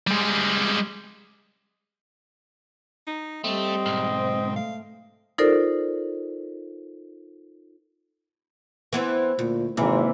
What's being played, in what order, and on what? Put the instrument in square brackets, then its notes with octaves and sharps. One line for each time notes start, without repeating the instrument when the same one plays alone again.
[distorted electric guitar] G3 G#3
[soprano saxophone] D#4
[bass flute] G3 [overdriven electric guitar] A3 [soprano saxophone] C4 [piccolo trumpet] D#5
[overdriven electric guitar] B1 G#2
[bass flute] C5
[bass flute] A3 [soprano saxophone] F5
[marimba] D#4 F4 A4 A#4 C5 D5
[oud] E3 B3 C4
[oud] D2 [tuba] A#2
[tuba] G#1 [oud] C3 [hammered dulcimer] E3 A#3